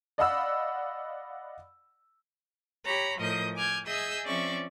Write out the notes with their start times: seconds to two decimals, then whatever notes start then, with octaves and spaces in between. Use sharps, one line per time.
0.18 D5 D#5 F5 F#5 B5 E6
2.86 G4 C#5 A#5 B5
3.18 A2 F3 A#4 D#5 D#6 G6
3.55 G#5 D6 F6 G6 G#6
3.85 G#4 D#5 E5 G#5 E6 G6
4.26 F3 C4 C#4 D5 E5 C#6